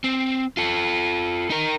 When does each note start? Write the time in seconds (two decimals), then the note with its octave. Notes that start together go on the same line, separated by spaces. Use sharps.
0.04 C4
0.57 F4 A4
1.50 D#4 A#4